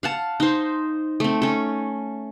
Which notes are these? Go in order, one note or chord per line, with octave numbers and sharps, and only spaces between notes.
F5 F#5 A5
D#4 C5
A3 C4
C#4 A4